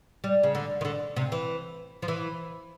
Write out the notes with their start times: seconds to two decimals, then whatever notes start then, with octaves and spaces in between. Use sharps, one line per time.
0.24 G3
0.43 C#3
0.55 D3
0.81 D#3
0.85 D3
1.16 C3
1.32 E3
2.02 F3
2.08 E3